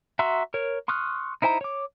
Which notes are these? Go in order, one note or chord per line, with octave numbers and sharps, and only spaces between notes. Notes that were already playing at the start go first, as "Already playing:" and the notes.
F#4 E5 A#5 C6 E6
A#4 C#5
C6 C#6 D#6 F6 F#6
D#4 E4 C5 G5 A#5
C#5 D6